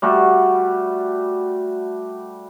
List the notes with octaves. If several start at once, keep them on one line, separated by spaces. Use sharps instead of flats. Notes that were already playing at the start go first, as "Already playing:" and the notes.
G3 A3 F#4